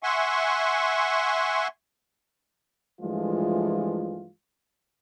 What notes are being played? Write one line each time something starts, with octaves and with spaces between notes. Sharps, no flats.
E5 F#5 G#5 C6 C#6
G2 E3 F3 G#3 A3 F4